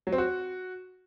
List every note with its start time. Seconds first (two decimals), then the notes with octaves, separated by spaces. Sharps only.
0.07 F#3
0.13 C4
0.18 F#4